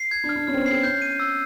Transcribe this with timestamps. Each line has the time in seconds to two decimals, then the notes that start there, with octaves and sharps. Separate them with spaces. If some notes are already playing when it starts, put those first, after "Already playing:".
Already playing: C7
0.11 G#6
0.24 D4
0.29 F6
0.36 D4
0.47 C#4 F6
0.54 C4
0.59 B3
0.66 C4 C7
0.83 C#4 G6
1.02 D#7
1.20 E6